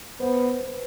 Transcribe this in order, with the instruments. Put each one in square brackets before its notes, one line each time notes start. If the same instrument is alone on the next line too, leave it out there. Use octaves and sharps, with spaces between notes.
[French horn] B3 [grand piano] C5
[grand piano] B4